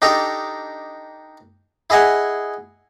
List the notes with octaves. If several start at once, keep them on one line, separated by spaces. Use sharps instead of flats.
D4 D#4 G4 A4 A#5
E4 G#4 D#5 F#5 G#5